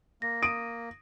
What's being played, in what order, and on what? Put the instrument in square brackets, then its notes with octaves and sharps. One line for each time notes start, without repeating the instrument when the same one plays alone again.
[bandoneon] A#3 [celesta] A#6
[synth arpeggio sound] D#6 D#7 [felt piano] D7